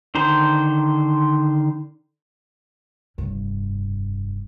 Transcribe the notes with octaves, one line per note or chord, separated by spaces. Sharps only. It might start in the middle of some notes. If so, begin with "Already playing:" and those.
D3 D#3 C5 A#5
F1 G2